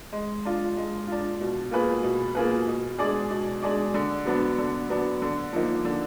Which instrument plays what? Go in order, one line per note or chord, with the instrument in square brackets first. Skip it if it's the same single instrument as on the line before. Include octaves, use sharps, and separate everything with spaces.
[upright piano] G#3
D4 F4
G#3
D4 F4
B2
A#3 F4 G#4 B4
B2
A#3 F4 G#4 B4
B2
G#3 D4 G#4 D5
B2
G#3 D4 G#4 D5
D3
F#3 B3 D4
D3
F#3 B3 D4
D3
F3 A#3 D#4
D3